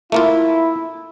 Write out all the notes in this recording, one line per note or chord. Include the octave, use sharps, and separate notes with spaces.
A3 A#3 E4 F4